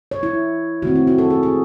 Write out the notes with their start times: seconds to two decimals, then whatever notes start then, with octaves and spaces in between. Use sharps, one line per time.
0.11 C#5
0.23 E4
0.82 D#3 A3 C4 F#4
0.96 E4
1.07 F#4
1.18 A4
1.30 G#4
1.43 G#4